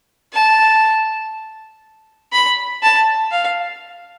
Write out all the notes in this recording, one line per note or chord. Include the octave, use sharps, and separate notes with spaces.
A5
B5
A5
F5